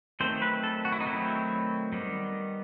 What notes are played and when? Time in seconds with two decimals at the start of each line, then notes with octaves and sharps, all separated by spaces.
0.20 D#3 F#3 A3 C4 C5
0.42 B4
0.63 A4
0.85 F#4
0.92 E4
1.00 D#4
1.07 D#3 F#3 A3 C4 E4
1.93 D#3 G3 B3